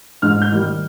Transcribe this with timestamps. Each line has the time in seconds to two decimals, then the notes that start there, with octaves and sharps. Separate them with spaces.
0.22 G#2 F6
0.42 G6
0.52 D#3 G3
0.62 F6